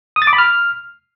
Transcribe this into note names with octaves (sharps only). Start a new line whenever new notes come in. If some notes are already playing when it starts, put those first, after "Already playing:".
D#6
A6
D6
B5
F6